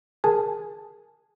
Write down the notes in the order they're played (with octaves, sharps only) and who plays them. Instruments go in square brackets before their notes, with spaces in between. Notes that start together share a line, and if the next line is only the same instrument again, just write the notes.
[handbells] G#4 A#4 G#5 A5